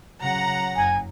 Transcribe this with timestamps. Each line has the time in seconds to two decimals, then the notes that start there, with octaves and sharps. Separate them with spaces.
0.20 C#3 F#3 F#5 A#5
0.76 F#1 G#5